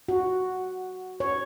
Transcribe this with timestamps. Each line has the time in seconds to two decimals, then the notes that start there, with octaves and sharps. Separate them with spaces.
0.08 F#4
1.20 C#5